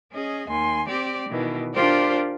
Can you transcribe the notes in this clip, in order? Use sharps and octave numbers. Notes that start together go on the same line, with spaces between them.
C#4 G#4 D#5
D#2 G#5 C6
C4 G4 D5
B2 D#3 E3
D4 F4 G4 A#4 C5 D5